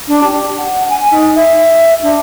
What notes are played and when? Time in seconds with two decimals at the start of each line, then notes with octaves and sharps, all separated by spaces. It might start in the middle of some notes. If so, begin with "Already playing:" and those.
0.08 D4
0.23 G4
0.58 F#5
0.90 G#5
1.11 D#4
1.35 E5
2.03 D4